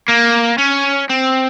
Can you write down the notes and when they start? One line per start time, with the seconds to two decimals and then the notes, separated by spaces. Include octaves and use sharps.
0.08 A#3
0.58 C#4
1.09 C4